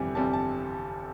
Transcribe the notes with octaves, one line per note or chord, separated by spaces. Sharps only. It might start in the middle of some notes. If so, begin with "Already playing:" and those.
Already playing: G1 F2 C3 E3 G3
G1 F2 C3 E3 G3 A5
A5